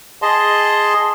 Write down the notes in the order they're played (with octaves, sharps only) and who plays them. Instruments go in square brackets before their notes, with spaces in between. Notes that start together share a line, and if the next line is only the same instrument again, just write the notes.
[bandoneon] G#4 D#5 A5 C6